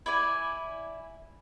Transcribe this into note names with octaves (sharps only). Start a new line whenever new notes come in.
E4 D5 G#5